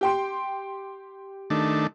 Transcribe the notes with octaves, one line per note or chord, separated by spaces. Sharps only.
G4 G5 C6
D#3 A3 D4